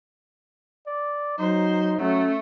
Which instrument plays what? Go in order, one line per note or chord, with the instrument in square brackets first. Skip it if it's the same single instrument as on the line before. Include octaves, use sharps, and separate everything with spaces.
[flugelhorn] D5
[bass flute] F#3 [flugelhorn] D#4 [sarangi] C5
[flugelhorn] F#3 [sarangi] A3 [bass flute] C#4